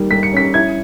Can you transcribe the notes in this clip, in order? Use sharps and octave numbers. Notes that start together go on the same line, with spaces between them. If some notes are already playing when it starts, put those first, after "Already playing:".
Already playing: D#3 G3 A#3
G3 B6
C#7
C#4 B6
E4 G#6